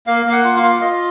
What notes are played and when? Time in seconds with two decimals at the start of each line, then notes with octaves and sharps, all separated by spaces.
0.07 A#3 F5
0.26 A#3
0.32 F#5
0.44 F4
0.56 F5
0.63 F4
0.81 F4 D#5